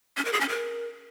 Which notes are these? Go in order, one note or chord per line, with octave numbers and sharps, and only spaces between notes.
C#4
A#4
G#4
C#4
A#4